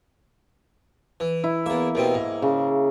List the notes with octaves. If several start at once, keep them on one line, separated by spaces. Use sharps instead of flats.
E3
E4
E2 A#3 E5
D#2 B2 C4
G#2
C#3